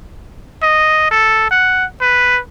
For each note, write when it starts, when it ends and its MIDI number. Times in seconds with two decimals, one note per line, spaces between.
0.62 1.09 75
1.11 1.51 69
1.51 1.85 78
2.01 2.40 71